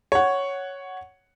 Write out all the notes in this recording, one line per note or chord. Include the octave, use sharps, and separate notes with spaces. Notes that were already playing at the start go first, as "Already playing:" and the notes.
C#5 F#5